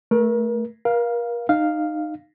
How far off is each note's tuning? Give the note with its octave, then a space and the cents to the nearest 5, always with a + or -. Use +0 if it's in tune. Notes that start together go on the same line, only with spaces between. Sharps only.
A3 +0 A#4 +35
A#4 +35 F5 +0
D#4 -20 F5 +0